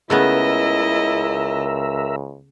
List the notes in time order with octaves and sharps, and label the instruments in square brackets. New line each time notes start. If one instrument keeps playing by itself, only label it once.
[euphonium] C#2 [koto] C#3 A3 B3 [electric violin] E4 D#5 [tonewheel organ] A#4 E5